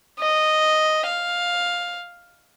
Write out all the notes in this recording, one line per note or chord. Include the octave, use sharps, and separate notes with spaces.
D#5
F5